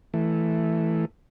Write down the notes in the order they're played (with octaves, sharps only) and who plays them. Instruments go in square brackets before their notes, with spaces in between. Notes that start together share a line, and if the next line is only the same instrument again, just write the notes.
[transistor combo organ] E3 A3